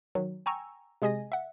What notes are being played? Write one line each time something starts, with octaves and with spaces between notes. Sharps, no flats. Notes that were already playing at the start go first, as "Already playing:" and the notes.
D#3 F#3
G5 G#5 A#5 C#6 E6
C3 G#3 G#4 D#5 G#5 A#6
E5 F#5